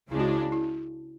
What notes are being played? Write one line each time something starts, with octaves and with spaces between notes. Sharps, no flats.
C#2 C#3 G#3 D4 E4
F#4
E4
E4